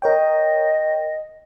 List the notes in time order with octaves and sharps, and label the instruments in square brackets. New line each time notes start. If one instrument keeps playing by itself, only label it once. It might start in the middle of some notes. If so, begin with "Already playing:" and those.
[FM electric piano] A#4 C#5 G5 [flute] D#5